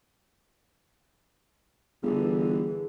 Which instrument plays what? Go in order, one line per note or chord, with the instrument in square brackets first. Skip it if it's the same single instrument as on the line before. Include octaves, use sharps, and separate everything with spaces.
[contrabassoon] G1 [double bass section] D3 E3 [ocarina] G#4